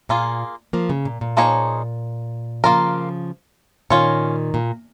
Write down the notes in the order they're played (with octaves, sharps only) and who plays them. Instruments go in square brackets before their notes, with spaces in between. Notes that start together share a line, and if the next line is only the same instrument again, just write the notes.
[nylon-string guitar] A#2 [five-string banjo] A#3 F4 G#4
[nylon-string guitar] F3 A#3
C#3
A#2
A#2
[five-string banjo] F3 A#3 D#4 G#4 C#5
[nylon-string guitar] C#3 F3 [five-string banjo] A#3 F4 A#4
[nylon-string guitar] A#2 D#3 [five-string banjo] C#4 F4 C#5
[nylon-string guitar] A#2